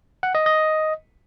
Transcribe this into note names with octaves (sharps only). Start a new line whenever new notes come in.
F#5
D#5
D#5